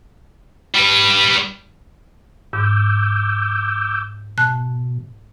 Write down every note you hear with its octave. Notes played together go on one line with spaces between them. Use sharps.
G3 B4
G#2 D6 E6 G6
B2 A5 F#6